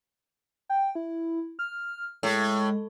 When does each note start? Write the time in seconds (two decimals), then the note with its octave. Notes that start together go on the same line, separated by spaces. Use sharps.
0.69 G5
0.95 E4
1.59 F6
2.23 A2 G#3